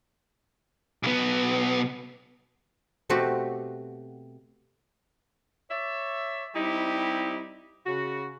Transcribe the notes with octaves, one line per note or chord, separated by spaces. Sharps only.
B1 B3
B2 A3 C4 F#4 G4
C#5 D5 E5
G3 C4 D#4 E4 G4
C#3 F#4